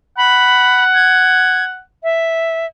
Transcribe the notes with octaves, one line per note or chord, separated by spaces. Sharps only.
F#5 B5
G#6
E5